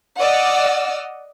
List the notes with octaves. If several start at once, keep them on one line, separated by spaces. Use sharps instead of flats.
D5 D#5 F#5 E6 F6